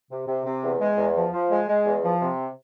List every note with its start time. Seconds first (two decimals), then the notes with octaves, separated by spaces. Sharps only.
0.10 C3
0.27 C3
0.45 C3
0.63 E2
0.80 G#3
0.97 E2
1.16 F3
1.33 F3
1.51 G#3
1.68 G#3
1.86 E2
2.03 F3
2.22 C3